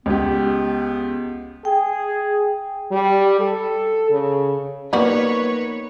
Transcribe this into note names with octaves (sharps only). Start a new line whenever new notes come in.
C#2 B3 G4
G#4 G5
G3
A4
C#3
F3 G3 A#3 B3 D#4 F#4 B4 C#5